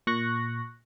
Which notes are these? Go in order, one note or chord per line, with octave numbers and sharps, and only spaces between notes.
A#2 C#6 F#6 A#6